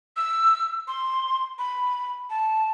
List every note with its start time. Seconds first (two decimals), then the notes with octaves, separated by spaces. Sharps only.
0.17 E6
0.88 C6
1.59 B5
2.30 A5